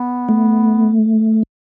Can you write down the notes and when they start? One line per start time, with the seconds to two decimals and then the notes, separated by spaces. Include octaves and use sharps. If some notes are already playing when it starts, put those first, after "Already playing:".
Already playing: B3
0.29 A3